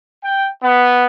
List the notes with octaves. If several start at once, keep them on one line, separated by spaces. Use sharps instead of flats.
G5
B3